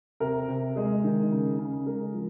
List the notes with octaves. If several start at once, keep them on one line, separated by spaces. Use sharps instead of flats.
C3 A#4
C3
G#3 G#4
D#3
C#3
C#3
G#3 A#4
F3